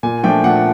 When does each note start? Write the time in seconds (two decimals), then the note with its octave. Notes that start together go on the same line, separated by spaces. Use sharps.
0.03 A#2 G#5
0.23 F3 A3 D4 G5
0.44 A#2 F#5